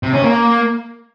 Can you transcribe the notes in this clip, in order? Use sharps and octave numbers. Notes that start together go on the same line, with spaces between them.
C3
C#4
A#3